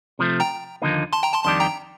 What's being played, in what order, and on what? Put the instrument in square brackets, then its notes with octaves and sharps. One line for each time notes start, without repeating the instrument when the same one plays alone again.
[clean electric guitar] C3 F3 A3
[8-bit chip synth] G5 A#5
[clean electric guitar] D#2 D3 F3 A#3 D#4
[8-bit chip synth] A5 C6
G5 A#5
A5 C6
[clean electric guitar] F2 D#3 G3 D4 G4 [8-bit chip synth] A5 C6
[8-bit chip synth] G5 A#5